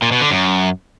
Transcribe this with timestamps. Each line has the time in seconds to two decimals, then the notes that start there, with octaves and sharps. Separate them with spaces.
0.02 A#2
0.12 B2
0.21 D3
0.31 F#2